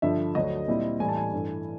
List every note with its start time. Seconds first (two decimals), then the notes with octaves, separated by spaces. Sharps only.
0.02 G2 D3 F3 E5
0.35 D2 D3 F#3 D#5
0.68 A#2 G3 C4 E4
1.00 A2 E3 G3 G#5
1.09 A5
1.17 G#5
1.33 G2 E3 A3